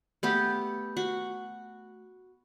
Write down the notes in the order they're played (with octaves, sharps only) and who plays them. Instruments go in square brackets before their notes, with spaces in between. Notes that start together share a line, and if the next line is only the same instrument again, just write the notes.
[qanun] A3 B3 G4
F#4